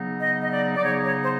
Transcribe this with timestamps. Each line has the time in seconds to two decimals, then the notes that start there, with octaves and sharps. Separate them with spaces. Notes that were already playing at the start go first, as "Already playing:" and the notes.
Already playing: C#3 F#3 B3 D#4
0.20 D#5
0.43 D#5
0.51 D5
0.76 D5
0.82 C#3 F#3 B3 D#4 C#5
1.05 C#5
1.23 C5